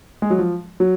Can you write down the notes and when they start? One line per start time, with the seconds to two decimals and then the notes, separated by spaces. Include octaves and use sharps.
0.22 G#3
0.30 F#3
0.39 F3
0.80 F#3